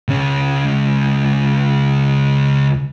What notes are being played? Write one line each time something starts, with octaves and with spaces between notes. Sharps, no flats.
C#2 C#4